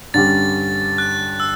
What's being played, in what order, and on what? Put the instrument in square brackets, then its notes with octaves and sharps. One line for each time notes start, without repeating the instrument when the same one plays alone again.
[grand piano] G2 D3 G3 C#4 G4 [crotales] A6
[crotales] F#6
E6